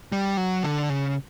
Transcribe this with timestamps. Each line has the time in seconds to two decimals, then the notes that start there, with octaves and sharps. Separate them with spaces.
0.12 G3
0.37 F#3
0.63 D3
0.90 C#3